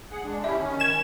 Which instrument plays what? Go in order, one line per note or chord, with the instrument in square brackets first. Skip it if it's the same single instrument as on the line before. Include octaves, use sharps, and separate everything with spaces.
[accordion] G#4 F#5
G#3 D4
[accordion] C#4 E4 G4 [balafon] E5
[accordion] D#3 C#4
[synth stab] G#6 E7